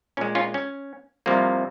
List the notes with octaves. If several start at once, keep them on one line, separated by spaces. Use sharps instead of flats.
A#2 G#3 C#4
C#4 F4
C#4
C2 C3 F3 A#3